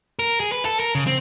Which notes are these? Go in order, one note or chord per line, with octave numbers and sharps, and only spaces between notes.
A#4
G#4
B4
A4
A#4
C#3
C4